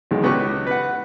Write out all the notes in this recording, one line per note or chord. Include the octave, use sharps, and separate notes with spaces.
B1 D#3 G#3
C#2 B3 G4 C#6
B4 F#5